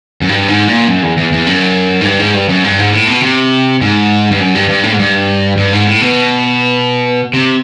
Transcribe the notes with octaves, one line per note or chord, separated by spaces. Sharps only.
F#2
G2
G#2
A#2
F#2
E2
E2
E2
F#2
G#2
G2
G#2
G2
F#2
G2
G#2
A2
B2
C3
G#2
G2
F#2
G2
G2
A2
G#2
G2
G2
G#2
A2
B2
C3